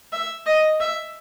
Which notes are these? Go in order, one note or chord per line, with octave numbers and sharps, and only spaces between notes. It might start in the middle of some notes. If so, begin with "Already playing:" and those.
E5
D#5
E5